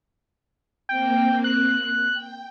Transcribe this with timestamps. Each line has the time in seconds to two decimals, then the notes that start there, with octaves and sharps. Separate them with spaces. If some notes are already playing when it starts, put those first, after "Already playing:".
0.89 A#3 C4 G5
1.44 F#6
2.12 G5